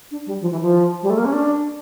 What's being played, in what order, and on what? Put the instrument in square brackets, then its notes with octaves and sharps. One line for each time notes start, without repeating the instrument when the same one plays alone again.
[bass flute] D4
G3
F3
E3
F3
G3
A3
A#3
C#4
D4